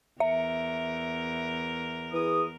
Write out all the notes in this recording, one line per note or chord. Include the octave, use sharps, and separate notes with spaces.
E2 A#4 E5
E3 G#4 D#6